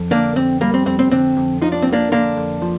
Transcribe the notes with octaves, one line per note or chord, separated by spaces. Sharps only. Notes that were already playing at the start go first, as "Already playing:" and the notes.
Already playing: F2
D3 A#3 D4
F2 C4
G3 A#3
C4
F2 C4
C4
D3 C4
F2
F3 D#4
D4
C4
F2
A#3 D4
D3 A#3 D4
F2
F3